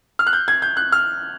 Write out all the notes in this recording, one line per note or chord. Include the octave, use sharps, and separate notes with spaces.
F6
F#6
G6
G#6
G6
F#6
F6